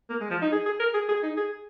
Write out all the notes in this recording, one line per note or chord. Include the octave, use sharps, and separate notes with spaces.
A#3
G#3
F3
D#4
G#4
G#4
A#4
G#4
G#4
D#4
G#4